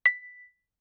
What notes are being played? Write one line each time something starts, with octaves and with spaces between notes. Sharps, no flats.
B6